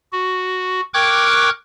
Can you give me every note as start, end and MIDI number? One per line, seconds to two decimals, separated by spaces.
0.13 0.81 66
0.94 1.50 70
0.94 1.50 79
0.94 1.50 85
0.94 1.50 86
0.94 1.50 90
0.94 1.50 92